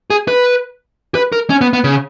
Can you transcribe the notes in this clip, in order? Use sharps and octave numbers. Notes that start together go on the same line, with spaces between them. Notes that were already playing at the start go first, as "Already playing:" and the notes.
G#4
B4
B4
A#4
C#4
B3
B3
C#3